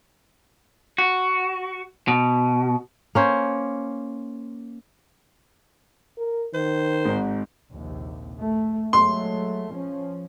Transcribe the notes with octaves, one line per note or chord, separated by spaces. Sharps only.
F#4
B2
A#3 C#4 C5
A#4
D#3 C5
G#1 G#2
A#1 D#2 C3
A3
F#3 G#3 A3 C6
F3 C#4